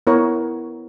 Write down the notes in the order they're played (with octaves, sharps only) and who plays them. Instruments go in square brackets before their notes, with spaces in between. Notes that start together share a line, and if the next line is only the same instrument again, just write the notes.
[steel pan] B3 E4 A#4 C#5